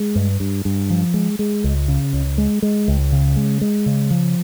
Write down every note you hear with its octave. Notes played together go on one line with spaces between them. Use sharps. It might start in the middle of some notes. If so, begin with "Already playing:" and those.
Already playing: G#3
G2
G2
G2
F3
G#3
G#3
C#2
C#3
C#2
G#3
G#3
C#2
C#3
G#3
G#3
C#3
F3